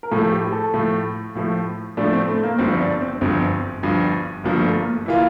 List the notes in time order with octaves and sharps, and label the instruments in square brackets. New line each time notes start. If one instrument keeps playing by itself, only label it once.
[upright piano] A#4
[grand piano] A2 F3 A3 [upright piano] A4
[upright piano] G4
A4
[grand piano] A2 F3 A3
A2 F3 A3
[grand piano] A2 F3 A3 [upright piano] D4
[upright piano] C4
A3
A#3
[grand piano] G1 G2 F3 [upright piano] C4
[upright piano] D4
C4
[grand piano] G1 G2 F3 [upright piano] C4
[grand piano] G1 G2 F3
[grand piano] G1 G2 F3 [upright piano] A#3
[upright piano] A3
A#3
[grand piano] E3 A#3 F4 [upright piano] E4